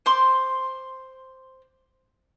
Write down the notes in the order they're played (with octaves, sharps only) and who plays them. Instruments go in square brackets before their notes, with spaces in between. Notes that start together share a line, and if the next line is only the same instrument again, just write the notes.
[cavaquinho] C5 C6 D6